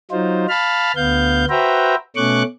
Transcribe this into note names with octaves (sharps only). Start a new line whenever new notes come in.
F#3 D#4 F4 C5
F5 A5 B5 F6
D2 B3 F5 G6
F#4 B4 C5 E5 G5 A#5
B2 A3 C#4 C#6 D6 F#6